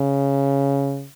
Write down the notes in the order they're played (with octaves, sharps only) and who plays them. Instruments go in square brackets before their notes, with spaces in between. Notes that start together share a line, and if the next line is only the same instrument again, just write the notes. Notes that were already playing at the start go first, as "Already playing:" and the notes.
Already playing: [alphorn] C#3